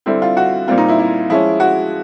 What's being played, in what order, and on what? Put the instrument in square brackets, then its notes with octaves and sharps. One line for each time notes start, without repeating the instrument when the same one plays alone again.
[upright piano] D3 G3 C4 E4
F4
F#4
A#2 G3 C4 F4
D#4
E4
E4
F3 G#3 C#4 E4
F#4